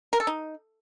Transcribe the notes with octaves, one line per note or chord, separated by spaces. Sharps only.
A#4
A4
D#4